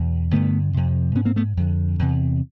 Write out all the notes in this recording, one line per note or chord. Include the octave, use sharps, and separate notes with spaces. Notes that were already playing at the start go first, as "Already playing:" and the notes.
Already playing: E2 B2
G2 D3 A3 B3
F2 C3
G#2 B3 C#4
A#3 C4
A3 B3
F2 D3
E2 C3